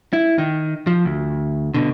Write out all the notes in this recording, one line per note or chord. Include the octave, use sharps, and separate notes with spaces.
E4
D#3
F3
D2
B2 D3